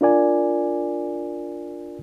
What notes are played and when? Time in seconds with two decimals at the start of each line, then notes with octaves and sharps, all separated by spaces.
0.01 D4 F4 A#4 D5 G#5